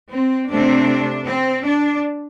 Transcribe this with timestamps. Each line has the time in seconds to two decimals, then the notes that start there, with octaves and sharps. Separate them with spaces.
0.11 C4
0.49 C3 A3 C4 D4
1.25 C4
1.64 D4